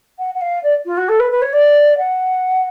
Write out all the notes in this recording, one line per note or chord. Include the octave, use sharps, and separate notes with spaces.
F#5
F#5
F5
D5
F4
F#4
A4
B4
B4
C#5
D5
F#5